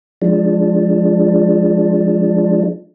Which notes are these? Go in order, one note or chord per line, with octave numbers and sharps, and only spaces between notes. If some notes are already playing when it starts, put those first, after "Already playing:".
F3 G#3 D4